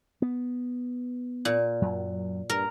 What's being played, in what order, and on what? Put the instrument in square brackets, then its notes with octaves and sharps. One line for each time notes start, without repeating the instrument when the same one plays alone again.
[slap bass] B3
[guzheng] A#2
[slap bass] F#2 F#3
[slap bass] G2 [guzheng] A#4